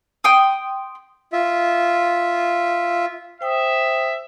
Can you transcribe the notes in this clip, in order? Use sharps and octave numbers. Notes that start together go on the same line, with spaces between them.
G5 C6 D#6
F4 E5
C5 E5 G5 D#6